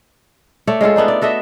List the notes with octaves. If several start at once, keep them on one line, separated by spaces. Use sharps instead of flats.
A3 C#5 D5
G#3 C#4 F4 A4
A3 B3 D4 D#4
D5
F#4 A4 D#5 E5